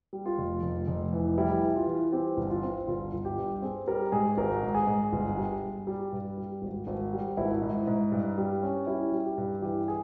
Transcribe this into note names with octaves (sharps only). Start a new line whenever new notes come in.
G3
F4
F1
F1
F1
E3
G3 E4
E3
F4
E3
C4 G4
G1
F4
C4
G1 F4
G1
G4
G2
C4 G#4
G3 A#4
G#2 G#4
G#1 A#4
G#2
G#4
G#2
G1
G3
G2
G3 G4
G2
G3
G#1
G#1
G3
G#1 E4
G#2 E4
G#2
G2
G3
C#4
G3 E4
G3
G4
G2
E3 G4
G#4